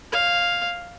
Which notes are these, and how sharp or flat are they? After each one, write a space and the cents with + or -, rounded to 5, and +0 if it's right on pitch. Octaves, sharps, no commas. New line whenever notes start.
C#5 -30 F5 +0